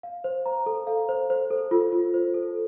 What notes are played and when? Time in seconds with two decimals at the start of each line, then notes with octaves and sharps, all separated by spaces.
0.03 F5
0.24 C5
0.46 A#5
0.66 A4
0.87 F5
1.09 C5
1.30 C5
1.50 A4
1.71 F4
1.92 F4
2.14 C5
2.34 A4